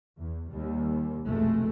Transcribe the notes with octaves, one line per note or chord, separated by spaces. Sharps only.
E2
D#2 G3
F1 B1 B2 G#3 A3